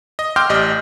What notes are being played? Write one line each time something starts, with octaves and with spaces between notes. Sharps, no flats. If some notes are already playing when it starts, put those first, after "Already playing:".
D#5
G5 C6 D6 E6 F6 G6
A1 G4 D5 D#5